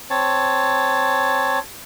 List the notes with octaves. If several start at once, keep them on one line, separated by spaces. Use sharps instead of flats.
C4 C#5 A5